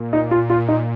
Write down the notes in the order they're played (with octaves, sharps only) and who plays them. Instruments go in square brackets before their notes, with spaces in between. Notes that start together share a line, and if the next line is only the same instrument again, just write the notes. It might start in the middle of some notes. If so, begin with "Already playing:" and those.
Already playing: [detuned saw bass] A#2
[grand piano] D#4
F4
F4
D#4